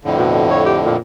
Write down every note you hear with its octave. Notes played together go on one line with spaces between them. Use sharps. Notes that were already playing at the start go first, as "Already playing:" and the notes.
F2 A2 D3
B2
C#5
G4
A#2